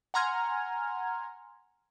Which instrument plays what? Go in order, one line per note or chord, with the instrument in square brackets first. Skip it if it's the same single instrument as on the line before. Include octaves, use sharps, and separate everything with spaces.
[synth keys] F#5 G#5 A#5 C6 F6 G#6